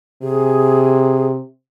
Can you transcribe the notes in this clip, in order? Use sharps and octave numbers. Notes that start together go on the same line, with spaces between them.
C3 G#4